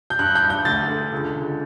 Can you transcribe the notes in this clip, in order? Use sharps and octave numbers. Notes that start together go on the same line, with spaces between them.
G6
G2 F#6
G6
G2
G6
D2 A6
D3
C#2
C#2